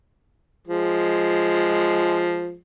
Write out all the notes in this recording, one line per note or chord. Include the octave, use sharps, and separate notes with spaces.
F3 G#3